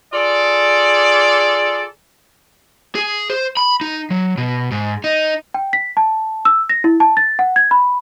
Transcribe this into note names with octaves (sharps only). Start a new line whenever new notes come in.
F4 G#4 A4 D5
G#4
C5
B5
D#4
F#3
B2
G#2
D#4
G5
B6
A5
E6
A#6
E4
A5
A6
F#5
G#6
B5